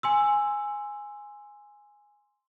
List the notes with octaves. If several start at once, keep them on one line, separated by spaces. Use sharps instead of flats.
G#5 C6 E6